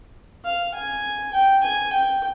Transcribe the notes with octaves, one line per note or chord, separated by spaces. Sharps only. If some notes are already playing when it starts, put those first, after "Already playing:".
F5
G#5
G5
G#5
G5